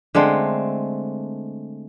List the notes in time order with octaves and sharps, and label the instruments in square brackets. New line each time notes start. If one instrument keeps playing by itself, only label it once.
[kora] D3 G#3 A3 C4